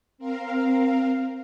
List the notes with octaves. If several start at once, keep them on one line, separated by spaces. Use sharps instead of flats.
C4 A#4 F5